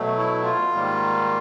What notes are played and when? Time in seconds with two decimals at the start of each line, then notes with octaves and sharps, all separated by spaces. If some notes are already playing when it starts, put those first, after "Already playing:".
Already playing: B2 F#3 A3
0.17 E4
0.43 F4
0.72 G#2 D#3 G3 A#3